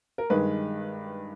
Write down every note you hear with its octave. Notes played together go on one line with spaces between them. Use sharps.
A#4
G2 D#3 G#3 B4